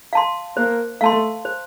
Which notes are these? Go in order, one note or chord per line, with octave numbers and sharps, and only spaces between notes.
F5 A5 C6
A#3 C5
A3 F5 A5 C6
C5